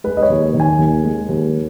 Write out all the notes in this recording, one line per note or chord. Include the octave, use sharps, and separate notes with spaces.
G#3 B4
D#5
C#5
D#2
D#3
G#5
D#2
G#3
D#2